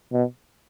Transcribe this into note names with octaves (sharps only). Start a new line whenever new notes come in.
B2